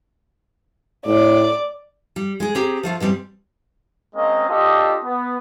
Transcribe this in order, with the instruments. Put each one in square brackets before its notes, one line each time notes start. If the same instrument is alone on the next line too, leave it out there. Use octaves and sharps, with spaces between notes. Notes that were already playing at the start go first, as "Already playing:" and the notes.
[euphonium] A2 [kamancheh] D5
[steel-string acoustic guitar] G3
G#3 G#4
C4 G4 G#4 A#5
F3 A3 F4
B2 E3 G3 C4
[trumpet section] G#3 A#3 C4 C#4 D#5 F5
D4 F4 G4 A4 D#5
B3